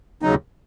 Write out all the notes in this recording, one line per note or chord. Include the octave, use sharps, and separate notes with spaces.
D#2 C#3 F#3 D#4